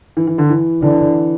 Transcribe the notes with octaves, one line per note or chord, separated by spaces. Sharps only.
E3
E3
D3
E3
D3 E3